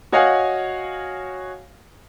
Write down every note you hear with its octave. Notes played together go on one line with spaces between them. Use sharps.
F#4 C#5 D#5 F5 F#5 G#5